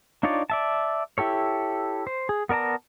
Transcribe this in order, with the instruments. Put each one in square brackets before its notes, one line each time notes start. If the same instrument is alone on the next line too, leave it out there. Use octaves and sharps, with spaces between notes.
[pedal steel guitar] D4 D#4 F4 C#5 D5
D5 E5 A5
E4 G4 A4 C#5
C5
G#4
B3 A#4 D5 A5 A#5